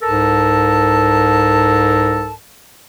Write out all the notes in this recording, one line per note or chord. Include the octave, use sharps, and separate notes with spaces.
C2 G#2 A4 A#4 A5